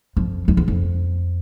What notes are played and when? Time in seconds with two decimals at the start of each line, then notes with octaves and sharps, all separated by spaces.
0.17 F2
0.48 F2
0.57 E2
0.68 F2